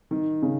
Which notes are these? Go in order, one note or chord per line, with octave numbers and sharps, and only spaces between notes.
D#3
C#3